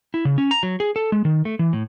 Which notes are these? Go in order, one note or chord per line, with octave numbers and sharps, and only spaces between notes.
E4
C#3
C#4
A#5
F#3
G#4
A4
G#3
D#3
A3
E3
A2